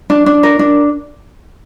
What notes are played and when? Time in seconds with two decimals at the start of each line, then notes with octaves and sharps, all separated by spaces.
0.10 D4
0.26 D4
0.43 A#4
0.59 D4